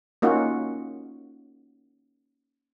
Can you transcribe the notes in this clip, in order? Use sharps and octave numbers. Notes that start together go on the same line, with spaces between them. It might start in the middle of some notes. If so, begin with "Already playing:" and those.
A#3 C#4 D#4 F4 F#4